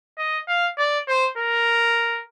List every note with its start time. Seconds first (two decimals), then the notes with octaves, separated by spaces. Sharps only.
0.18 D#5
0.48 F5
0.78 D5
1.08 C5
1.38 A#4